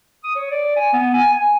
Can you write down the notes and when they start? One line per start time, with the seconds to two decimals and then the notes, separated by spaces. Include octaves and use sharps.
0.24 D#6
0.35 C#5
0.50 D5
0.76 G#5
0.93 B3
1.14 G#5
1.32 G#5